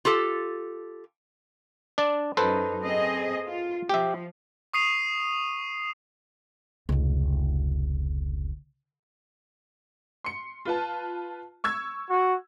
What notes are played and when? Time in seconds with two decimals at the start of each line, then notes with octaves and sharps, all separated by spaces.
0.05 F4 G4 A4
1.98 D4 D5
2.37 F#2 D#4 A4 B4 C5
2.84 C4 G#4 D#5
3.47 F4
3.89 F3 G4 E5
4.74 C#6 D#6 C7 D#7 F7
6.89 F1 C#2
10.24 C6 C#7
10.65 F4 B4 A5
11.64 C#6 E6 G#6
12.10 F#4